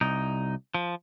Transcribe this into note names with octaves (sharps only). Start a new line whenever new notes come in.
C2 D#4
F3